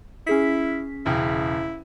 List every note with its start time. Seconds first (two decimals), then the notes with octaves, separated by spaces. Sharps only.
0.27 C#4 E4 G#4 B6
1.06 E1 C#3 E4 G5